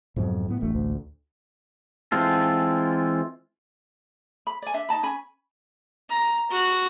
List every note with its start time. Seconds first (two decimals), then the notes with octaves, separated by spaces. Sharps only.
0.16 F2 G#2 B2 F#3
0.48 A2 B3
0.61 E1 A1 A3
0.74 D2
2.12 E3 G#3 C4 F4 A4
4.47 B5
4.62 D5 G#5
4.74 D4 E5
4.89 D#4 D#5 A5 B5
5.03 C#4 G#5 B5
6.10 A#5
6.51 F#4